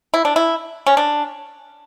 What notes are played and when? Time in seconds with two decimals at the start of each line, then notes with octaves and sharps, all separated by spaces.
0.14 E4
0.25 D4
0.36 E4
0.87 C#4
0.97 D4